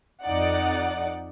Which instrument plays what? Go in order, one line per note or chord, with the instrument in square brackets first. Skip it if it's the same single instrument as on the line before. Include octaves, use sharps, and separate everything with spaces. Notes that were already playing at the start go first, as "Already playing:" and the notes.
[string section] F2 D#4 D5 F#5